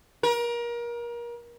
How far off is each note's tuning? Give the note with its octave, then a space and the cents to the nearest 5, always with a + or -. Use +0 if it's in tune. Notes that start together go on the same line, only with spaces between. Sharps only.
A#4 +30